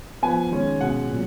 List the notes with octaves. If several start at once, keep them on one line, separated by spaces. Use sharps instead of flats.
F3 B3 G#5
D#3 G#3 C#4
B2 G#3 C#4 F#5
A#2 F#3